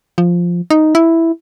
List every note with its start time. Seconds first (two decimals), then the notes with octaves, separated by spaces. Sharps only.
0.18 F3
0.70 D#4
0.95 E4